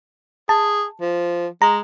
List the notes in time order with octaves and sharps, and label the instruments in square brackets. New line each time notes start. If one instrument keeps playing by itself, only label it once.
[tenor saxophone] G#4 [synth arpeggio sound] A5
[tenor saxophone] F3
[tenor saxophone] G#3 [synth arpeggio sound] A#5